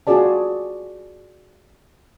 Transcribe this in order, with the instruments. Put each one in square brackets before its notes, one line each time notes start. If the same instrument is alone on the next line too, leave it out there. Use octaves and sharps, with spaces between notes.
[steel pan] F4 F#4 G#4 D5 A5